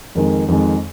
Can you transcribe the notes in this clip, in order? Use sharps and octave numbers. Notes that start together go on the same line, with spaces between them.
F2 D#3 G#3
F2 D#3 G#3